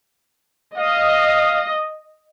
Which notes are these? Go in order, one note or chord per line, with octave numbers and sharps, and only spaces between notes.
D#5 F5